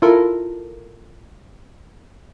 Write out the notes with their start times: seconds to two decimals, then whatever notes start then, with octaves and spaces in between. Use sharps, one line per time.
0.02 E4 F4 A4 A#4